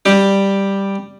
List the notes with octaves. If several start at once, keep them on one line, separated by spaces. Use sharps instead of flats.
G3 G4